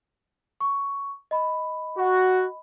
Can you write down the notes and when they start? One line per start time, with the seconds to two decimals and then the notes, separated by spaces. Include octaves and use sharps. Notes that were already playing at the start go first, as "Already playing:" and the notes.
0.60 C#6
1.31 D#5 B5
1.97 F#4